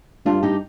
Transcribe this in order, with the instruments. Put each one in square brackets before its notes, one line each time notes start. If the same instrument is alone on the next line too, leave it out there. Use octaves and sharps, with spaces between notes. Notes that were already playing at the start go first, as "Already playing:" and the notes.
[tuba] G2 [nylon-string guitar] D4 F4
[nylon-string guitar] D#4 G4